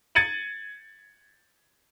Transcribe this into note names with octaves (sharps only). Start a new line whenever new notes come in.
G#6 A6 C#7 D#7 F#7